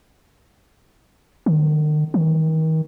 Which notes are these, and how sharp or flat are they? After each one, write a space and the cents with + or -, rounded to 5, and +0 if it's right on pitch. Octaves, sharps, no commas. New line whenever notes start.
D#3 -40
D#3 +35